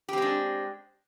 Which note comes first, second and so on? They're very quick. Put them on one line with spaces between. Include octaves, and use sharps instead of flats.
G4 C4 G#3 D4